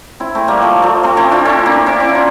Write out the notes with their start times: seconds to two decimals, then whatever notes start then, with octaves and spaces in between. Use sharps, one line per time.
0.20 C4 E4
0.35 A3 C4
0.48 G3 A#3
0.62 F3 A3
0.82 F3 A3
1.03 A3 C4
1.17 C4 E4
1.31 D4 F4
1.45 C4 E4
1.66 A#3 D4
1.86 C4 E4
2.00 C4 E4
2.14 D4 F4